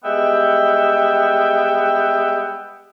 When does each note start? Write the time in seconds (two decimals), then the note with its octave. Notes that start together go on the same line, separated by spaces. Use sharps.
0.04 G3 G#3 B3 E5 G5